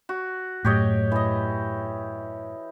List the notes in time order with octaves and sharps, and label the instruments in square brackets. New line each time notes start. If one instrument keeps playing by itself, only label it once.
[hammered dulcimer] F#4
[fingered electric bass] F#2 A2 [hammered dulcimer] G4 C#5 D#5
[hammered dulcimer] E3 D#5